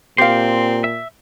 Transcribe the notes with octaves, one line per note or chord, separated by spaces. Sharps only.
A#2 C4 G4 F5 C6
E5